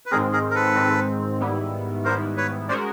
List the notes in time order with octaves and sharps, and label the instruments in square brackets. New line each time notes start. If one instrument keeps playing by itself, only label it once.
[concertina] B4
[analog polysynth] G#2 D#3 G#3 C4 [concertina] G#4 A#4
[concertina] G#4 A#4
A#4
A4 B4
[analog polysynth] G#2 D#3 G#3 C4
G#2 D#3 G3 B3 E4
[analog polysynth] G#2 D#3 G3 B3 E4 [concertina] A#4 C5
[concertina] B4 C#5
[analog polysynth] G#3 C#4 F#4 A#4 [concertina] C5 D5